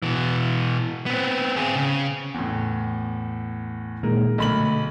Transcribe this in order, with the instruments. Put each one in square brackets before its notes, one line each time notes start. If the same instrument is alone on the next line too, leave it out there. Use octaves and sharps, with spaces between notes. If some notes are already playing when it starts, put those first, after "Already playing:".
[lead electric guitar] B2 E3
B3 C4
C4 G#4
C#3
[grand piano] E2 A2
[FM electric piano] A#2 D#3 G#3 [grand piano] A#4
[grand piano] B1 B5 F#7 [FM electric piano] D3 A3